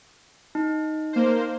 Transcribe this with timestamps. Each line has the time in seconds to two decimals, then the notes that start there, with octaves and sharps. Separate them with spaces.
0.55 D#4
1.13 A#3 C5